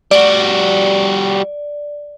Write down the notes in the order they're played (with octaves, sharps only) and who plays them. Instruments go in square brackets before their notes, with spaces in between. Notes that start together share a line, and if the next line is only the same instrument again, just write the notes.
[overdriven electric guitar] G3 F#4 [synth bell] D5